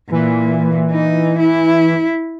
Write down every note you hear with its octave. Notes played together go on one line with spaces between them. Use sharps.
A#2 E3
D#4
E4